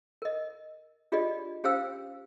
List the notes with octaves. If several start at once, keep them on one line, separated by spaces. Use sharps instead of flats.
A#4 D#5
D4 F4 G4 G#4 D5 D#5
C#4 G4 C5 F5 G5 E6